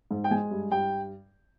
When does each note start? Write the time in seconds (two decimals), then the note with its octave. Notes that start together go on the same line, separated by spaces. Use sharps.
0.11 G#2
0.24 G5
0.31 G#3 G#5
0.51 G2
0.71 G2 G5